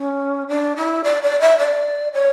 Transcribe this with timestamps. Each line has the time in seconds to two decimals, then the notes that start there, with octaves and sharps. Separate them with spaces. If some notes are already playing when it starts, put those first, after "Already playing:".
Already playing: C#4
0.48 D4
0.76 E4
1.04 D5
1.22 D5
1.41 E5
1.58 D5
2.14 C#5